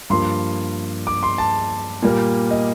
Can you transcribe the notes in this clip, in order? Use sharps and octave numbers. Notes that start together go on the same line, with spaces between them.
G2 F3 A#3 C6
D6
C6
A5
A#2 G3 A#3
D#5